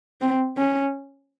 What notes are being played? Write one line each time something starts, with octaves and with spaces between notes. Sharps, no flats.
C4
C#4